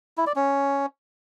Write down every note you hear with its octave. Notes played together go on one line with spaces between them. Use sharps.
E4
D5
C#4